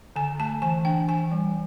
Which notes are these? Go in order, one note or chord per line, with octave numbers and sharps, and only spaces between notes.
D3 G#5
A3 A5
E3 G#5
D4 G5
E3 G#5
G3